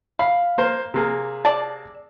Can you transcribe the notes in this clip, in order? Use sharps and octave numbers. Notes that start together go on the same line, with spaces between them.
F5 B5
A#3 C5
C3 A#3 G#4
D5 A5